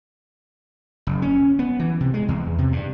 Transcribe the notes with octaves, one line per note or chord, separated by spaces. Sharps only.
F#1
C#4
B3
E3
C3
G#3
E2
C3
G2